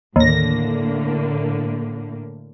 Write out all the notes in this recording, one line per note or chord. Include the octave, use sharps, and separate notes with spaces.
D#2 A2 D3 A#3 A#6